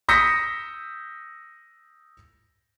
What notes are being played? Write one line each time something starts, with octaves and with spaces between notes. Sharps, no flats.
D#6 E6 G6 A#6 B6 C#7